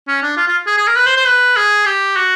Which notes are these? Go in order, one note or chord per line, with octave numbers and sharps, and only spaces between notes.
C#4
D4
F4
F4
G#4
G#4
A#4
B4
C5
C5
B4
G#4
G4
F#4